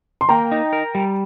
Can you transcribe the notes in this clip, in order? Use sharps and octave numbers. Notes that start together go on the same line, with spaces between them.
C6
A#3 G5 A#5
D#4
A#4
G3